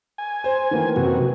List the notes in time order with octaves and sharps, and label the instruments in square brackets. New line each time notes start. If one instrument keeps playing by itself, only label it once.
[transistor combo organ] G#5
[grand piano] C5
D#3 E3 A#3
[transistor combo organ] F#2 C3 F#4